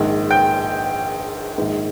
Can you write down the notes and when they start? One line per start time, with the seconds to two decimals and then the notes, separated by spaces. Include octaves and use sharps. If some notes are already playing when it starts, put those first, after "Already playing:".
Already playing: A#1 G#2 D#3
0.31 G5 G6
1.58 A#1 G#2 D#3